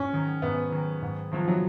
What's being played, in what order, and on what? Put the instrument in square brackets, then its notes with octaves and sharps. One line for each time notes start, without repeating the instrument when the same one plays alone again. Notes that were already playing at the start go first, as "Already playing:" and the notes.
Already playing: [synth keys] G#2 [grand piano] C#4
[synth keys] D#3 F#3
[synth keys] G#2 [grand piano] B3
[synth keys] D#3 F#3
G#2
[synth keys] D#3 F#3 [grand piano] F3
[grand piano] F#3